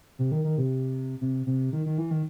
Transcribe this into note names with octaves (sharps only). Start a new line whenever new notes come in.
C3
D#3
D#3
C3
C3
C3
D#3
D#3
E3
D#3